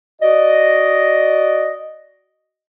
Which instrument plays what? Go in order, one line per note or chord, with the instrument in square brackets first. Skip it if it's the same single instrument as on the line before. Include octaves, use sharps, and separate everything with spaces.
[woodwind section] F#4 D5 D#5